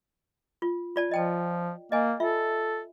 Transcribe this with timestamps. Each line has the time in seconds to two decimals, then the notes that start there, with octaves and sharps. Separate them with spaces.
0.62 F4
0.96 F4 D5 A5
1.11 F3 D#5 G5 A5
1.92 A#3 D#5 G#5
2.20 F4 A4 E5